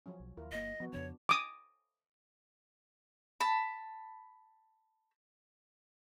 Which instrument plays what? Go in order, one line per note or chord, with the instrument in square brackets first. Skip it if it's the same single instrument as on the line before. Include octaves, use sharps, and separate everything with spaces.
[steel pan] F3 F#3 C#4
[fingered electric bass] B1
[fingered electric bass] D#2 [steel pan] E4 F4 A#4
[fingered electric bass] G1 A#3 [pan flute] D#5
[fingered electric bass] F3 [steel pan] B3 F#4
[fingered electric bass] F2 C#3 F3 [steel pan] B3 D4 [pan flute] C#5
[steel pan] D6 D#6
[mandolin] A5 B5